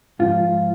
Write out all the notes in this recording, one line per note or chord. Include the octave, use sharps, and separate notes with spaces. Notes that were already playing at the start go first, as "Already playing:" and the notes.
G#2 F3 F4